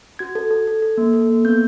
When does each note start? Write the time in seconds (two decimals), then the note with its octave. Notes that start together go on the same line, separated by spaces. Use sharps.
0.19 F#4 G#6
0.35 A4
0.51 A4
0.67 A4
0.83 A4
0.98 A#3
1.13 A4
1.30 A#3
1.45 B3 G6